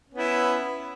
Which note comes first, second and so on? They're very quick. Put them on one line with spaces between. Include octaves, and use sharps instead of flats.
C#4 B3 E4